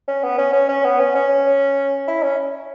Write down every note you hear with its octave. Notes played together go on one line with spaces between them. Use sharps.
C#4
B3
C#4
C#4
C#4
B3
C#4
C#4
E4
C#4